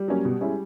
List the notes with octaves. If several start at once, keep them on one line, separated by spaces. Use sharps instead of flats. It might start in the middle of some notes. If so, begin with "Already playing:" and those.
Already playing: G3
F#3 A#3 C#4
B2
G#3 C#4 E4